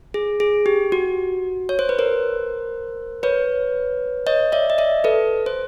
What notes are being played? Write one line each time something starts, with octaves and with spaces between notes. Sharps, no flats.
G#4
G#4
G4
F#4
C#5
C5
B4
A#4 C5
B4 C#5
C#5 D#5
D5 E5
D#5
D5 E5
A4 B4
C5